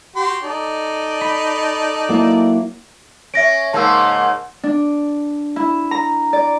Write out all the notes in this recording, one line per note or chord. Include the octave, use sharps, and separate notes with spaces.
F#4 G4 C6
D#4 A4 D5
B5
F#3 A#3 E4
C#4 E5 A#6 D7
G#2 C#3 A#3 A5 E6
D4
E4
A#5
D5